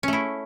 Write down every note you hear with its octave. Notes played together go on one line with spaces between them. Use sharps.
A3 C#4 E4